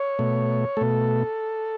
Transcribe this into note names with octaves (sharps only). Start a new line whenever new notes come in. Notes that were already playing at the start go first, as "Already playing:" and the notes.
Already playing: C#5
B2 A3
B2 A3 A4